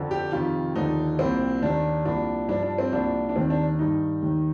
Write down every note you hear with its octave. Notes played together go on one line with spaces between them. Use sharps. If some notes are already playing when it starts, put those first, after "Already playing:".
Already playing: F2 D3 F3
G4
F2 C3 D#3 F4
D#2 D3 F3 D#4
C2 A#2 F3 C4
D#2 D#3 D4
C2 A#2 F3 D4
G2 F3 D4
D4
C4
C2 A#2 F3 D4
D4
D#2 D#3 C4
D4
G2 D#3 D#4
D#2 D#3